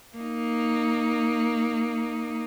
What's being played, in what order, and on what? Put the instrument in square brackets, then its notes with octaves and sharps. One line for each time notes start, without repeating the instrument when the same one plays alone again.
[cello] A#3 D#4